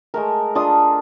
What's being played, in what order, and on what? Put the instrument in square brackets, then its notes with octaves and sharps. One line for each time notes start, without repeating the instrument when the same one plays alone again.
[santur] G#3 A3 A#4
D4 F4 D#6